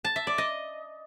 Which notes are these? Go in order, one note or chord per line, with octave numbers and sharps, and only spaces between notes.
A5
E5
D5
D#5